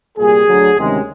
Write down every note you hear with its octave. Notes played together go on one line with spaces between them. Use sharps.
C2 A#2 G3 G#4
D2 D3 F#3
D2 C3 D#3 G#3 C#4